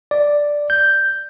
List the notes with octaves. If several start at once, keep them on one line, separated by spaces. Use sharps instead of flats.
D5
G6